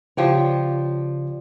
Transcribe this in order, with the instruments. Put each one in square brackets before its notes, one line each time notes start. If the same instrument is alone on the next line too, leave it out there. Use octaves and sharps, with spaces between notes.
[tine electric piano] C#3 D5 [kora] F3 G4 C#5